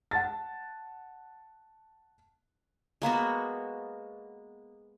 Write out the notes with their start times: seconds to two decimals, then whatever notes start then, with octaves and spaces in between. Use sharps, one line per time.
0.11 F#5 A5 A6
3.02 G#3 A#3 B3 F#4